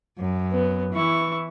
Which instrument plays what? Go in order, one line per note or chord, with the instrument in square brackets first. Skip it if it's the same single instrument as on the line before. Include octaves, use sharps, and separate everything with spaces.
[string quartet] F#2
[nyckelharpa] B3
[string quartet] E3 [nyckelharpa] E4 C#6